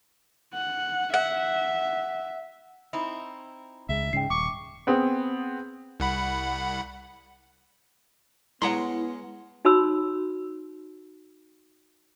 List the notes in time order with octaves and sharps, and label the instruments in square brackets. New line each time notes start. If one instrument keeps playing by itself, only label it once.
[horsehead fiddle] F#5
[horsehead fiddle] E5 [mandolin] F#5
[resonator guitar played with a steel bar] C4 D#4 E4
[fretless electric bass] C#2 G#3 [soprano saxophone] E5
[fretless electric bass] G#2 C#3 G#3 [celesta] G5 C7
[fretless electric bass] D#1 [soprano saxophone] C#6 [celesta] D6
[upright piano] B3 C4 G#4
[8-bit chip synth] C2 F#5 B5
[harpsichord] G#3 C#4 [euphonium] B3 [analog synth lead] E4 [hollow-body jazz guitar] F#5 A#5 C6
[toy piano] D#4 F#4 C#5 B5 C6 E6